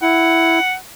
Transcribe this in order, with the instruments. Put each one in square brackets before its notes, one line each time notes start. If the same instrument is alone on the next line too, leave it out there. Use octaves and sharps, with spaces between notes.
[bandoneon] E4 [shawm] F#5